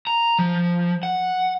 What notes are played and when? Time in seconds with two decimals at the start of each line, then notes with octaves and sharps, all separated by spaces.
0.07 A#5
0.39 F3
1.03 F#5